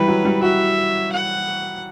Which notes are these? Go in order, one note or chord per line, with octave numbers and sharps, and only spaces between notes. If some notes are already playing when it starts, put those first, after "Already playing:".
Already playing: E3 G3 B4
F#3
G3
F#4 E5
F#5